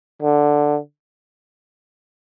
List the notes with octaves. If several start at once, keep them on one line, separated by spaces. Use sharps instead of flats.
D3